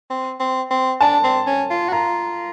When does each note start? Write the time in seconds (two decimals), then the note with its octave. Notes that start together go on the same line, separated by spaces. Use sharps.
0.10 C4
0.40 C4
0.71 C4
1.01 D4 A5
1.24 C4
1.47 C#4
1.70 F4
1.89 F#4
1.92 F4 A#5